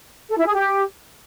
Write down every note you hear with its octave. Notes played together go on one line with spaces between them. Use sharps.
A4
E4
G#4
G4